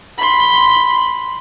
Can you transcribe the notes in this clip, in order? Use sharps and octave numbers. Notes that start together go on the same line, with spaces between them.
B5 C6